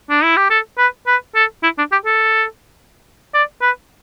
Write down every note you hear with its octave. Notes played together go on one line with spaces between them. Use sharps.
D4
E4
G4
A4
B4
B4
A4
E4
D4
G4
A4
D5
B4